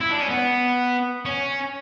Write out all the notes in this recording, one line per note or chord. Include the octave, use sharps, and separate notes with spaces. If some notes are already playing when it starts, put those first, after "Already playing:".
E4
D4
C#4
B3
C#4